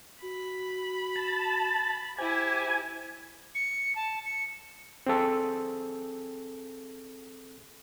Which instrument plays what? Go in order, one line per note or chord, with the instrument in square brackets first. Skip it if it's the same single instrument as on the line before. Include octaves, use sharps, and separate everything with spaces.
[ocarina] F#4 [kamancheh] B5
[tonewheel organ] A5
[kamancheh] E4 G4 [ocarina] C5 [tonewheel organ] G#5
[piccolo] C#7
A5
C#7
[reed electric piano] C4 G#4 A4